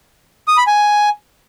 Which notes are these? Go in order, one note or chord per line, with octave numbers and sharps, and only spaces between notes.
D#6
B5
G#5